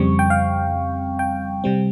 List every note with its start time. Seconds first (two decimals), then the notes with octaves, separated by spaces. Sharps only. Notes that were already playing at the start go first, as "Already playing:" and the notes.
Already playing: F2 C#3 G3 C4 C#6
0.19 G5
0.30 F5
1.19 G5
1.64 C3 G3 C4